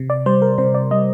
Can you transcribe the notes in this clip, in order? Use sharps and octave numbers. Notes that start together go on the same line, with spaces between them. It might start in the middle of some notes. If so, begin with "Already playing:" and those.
Already playing: C3
D5
G3 C5
A#4
C3 C5
D5
G3 D#5